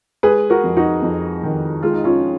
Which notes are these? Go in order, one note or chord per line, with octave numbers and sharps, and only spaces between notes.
G#3 G#4 B4
F#4 A#4
F2
D#4 F#4
F2
D#3
G#3 F4
D#4
C#4 F4